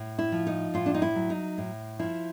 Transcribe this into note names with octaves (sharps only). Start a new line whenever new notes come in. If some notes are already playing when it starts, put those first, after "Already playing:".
Already playing: A2
E4
F3
D#4
A2 F4
D4
D#4
E4
F#3
D#4
A2
F3 E4